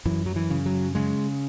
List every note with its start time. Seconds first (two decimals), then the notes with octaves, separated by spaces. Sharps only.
0.05 F#2 E3
0.26 F#3
0.36 E3
0.50 C#3
0.66 F#3
0.95 C#3 G#3